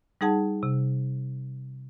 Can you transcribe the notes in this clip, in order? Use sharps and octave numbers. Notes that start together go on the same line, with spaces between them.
G3 D#4 G#4 F#5 A5
C3